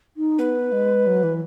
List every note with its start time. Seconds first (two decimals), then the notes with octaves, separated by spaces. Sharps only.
0.16 D#4
0.39 B3 B4
0.72 G#3
1.06 F#3
1.23 E3